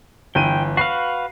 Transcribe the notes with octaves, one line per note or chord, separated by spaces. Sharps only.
G1 E3 G5 D#7
F#4 B4 F5 C7